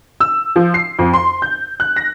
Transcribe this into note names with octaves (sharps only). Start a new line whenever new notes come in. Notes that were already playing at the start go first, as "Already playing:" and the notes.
E6
F3
C7
F2
C6
G6
F#6
A#6